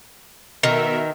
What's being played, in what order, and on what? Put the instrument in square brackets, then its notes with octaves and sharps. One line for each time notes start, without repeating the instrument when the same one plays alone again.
[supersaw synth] B2 A#4 E5 [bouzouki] D#3